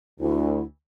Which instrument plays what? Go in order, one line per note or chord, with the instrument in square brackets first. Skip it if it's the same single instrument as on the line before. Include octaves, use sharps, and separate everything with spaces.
[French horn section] D2 [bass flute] E4